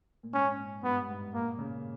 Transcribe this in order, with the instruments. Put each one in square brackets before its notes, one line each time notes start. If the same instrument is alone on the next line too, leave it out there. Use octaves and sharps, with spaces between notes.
[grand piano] A#2
[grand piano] G#2 [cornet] C#4
[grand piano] G2 [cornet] B3
[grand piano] G#2
[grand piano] A#2 [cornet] A#3
[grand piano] C#3